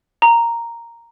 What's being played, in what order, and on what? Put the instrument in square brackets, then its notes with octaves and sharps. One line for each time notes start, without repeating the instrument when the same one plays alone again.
[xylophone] A#5